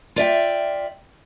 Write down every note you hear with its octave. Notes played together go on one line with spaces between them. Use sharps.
F4 D5 E5 G5